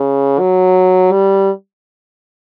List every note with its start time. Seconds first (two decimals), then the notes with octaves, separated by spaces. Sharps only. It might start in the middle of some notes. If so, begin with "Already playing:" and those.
Already playing: C#3
0.39 F#3
1.12 G3